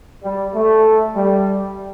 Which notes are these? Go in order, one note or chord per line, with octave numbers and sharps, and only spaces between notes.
G3
A3
G3